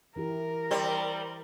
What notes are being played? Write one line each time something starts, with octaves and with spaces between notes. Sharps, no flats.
E3 E4 G4 A#4
G3 C4